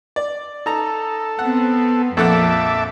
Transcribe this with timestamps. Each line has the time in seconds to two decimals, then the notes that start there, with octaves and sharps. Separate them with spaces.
0.16 D5
0.66 D#4 A4 A#5
1.39 B3 C4 F#5
2.17 A#1 F2 A4 E5 F#5 A5 D6